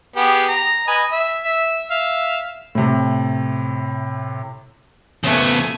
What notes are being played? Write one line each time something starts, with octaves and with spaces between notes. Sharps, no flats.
B3 G4 G#4
A#5
B4 D#5 G#5
E5
E5
E5 F5
A2 C3
C#3 A3 B3 G#5